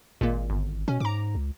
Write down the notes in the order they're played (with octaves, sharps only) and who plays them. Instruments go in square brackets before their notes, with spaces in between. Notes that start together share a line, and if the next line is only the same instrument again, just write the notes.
[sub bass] G#1 [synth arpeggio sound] A#2 G#3 A#3
[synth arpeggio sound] G1
[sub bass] B2 [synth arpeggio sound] C#4
[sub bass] G#2 [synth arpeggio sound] A#5 D6
[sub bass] C#2